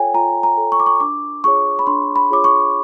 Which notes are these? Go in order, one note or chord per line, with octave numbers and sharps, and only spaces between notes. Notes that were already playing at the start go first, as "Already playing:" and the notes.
Already playing: F4 A4 C#5 G5 G#5
F4 A#5
A#5
A4 C#5
C#6
D6
C#6
D4 D6
F4 G#4 C#5 C#6
B5
D4 C6
B5
F4 G#4 C#5 D6
C#6